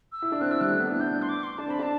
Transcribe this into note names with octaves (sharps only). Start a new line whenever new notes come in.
E6
E4
D4
C4 F#6
E4 E6
G3 F#6
A3
B3
D4
E4
F#6
D4 G6
C6
D6
C6
D4 A5
C4 B5
D4 A5